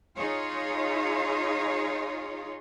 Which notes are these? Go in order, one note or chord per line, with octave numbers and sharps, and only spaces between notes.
D#4 F4 G#4 C#5